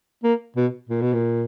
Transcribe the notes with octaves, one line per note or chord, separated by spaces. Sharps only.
A#3
B2
A#2
B2
A#2